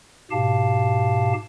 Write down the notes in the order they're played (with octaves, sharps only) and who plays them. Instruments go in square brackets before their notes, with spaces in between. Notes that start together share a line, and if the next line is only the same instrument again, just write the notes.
[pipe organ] G#2 B2 G4 F5 A5